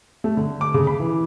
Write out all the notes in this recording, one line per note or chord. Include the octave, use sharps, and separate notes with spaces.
A3
D3
D6
C#3
B5
E3